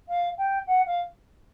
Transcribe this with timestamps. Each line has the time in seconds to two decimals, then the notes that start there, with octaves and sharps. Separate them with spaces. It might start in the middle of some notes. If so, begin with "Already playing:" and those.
0.08 F5
0.38 G5
0.67 F#5
0.86 F5